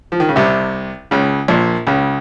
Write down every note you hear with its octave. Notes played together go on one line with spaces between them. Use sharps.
F3
D#3
C#3
C2 C3
C#2 C#3
A#1 A#2
C#2 C#3